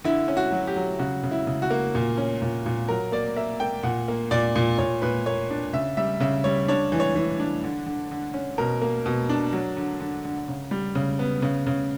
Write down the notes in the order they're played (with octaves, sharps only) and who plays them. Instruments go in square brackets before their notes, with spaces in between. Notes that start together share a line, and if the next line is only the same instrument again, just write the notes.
[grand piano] D3 E4
C#4
F#4
F#3
G4
F#3
C#3 F#4
C#3
E4
C#3
F#4
A#3
A#2
C#4
A#2
A#2
F#3 A#4
A#3 D5
A#3 E5
A#3 G5
A#2 F#5
A#3
A#2 D5
A#2
A#2 C#5
A#2 B4
A#3 C#5
D4
C#3 E5
G3 E5
C#3 E5
G3 C#5
D4 C#5
E3
C#5
E3
D4
D3
D3
D3
C#4
B2 A#4
A#3
B2
D4
F#3
D3
D3
D3
C#3
G3
C#3
B3
C#3
C#3